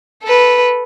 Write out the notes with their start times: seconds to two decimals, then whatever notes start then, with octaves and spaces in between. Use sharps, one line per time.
0.23 A4 B4